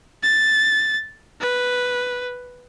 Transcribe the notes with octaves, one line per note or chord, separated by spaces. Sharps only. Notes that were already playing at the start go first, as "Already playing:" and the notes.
A6
B4